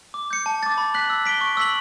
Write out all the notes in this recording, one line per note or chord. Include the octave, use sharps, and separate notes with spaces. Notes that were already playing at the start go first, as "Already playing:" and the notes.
D6
G6 C#7
A5
D6 A6
B5
F#6 B6 F#7
E6
B6 D7 G7
C#6
E6 B6 F#7